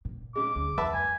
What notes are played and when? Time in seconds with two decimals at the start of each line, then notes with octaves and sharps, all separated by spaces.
0.05 A#2
0.36 C#3 G#3 D6
0.55 D2
0.78 F2 B4 E5 A5
0.94 F#2 G#5